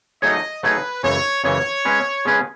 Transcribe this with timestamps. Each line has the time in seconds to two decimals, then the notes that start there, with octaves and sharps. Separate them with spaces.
0.22 F#3 A3 D#4 G#4 C#5 D#5
0.63 F#3 A3 D#4 G#4 B4 C#5
1.03 F#2 C#3 E3 G#3 C#5
1.44 F#2 C#3 E3 G#3 C#5
1.85 G#3 C#4 G#4 B4
2.25 G#3 C#4 G#4 B4